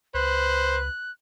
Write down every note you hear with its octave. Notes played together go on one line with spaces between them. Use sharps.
C#2 B4 C5 F#6